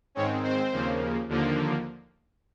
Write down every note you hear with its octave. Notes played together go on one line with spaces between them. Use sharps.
G#2 D#3 G#3 C4 C#4 C#5
C4 C5
D#2 C#3 F3 A#3
D#2 D3 F3 A#3